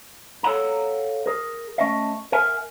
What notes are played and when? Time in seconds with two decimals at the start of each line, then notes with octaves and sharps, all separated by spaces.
0.43 A4 C#5 F5 F#5 A#5
1.26 G#4 A#4
1.78 A3 C#4 D#5 E5
2.32 A#4 E5 F#5 G#5